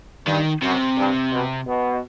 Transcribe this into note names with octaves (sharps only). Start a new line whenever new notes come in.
G2 D#3
F#2 C3
G2
B2
B2